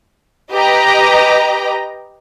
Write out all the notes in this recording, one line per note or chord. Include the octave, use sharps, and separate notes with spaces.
G4 B4 D#5 G5 A#5